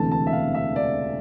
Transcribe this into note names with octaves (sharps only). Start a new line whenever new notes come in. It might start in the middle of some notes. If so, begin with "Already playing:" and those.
Already playing: E1 D2 C3 E3 A3 A5
A5
E5
F5
E5
D5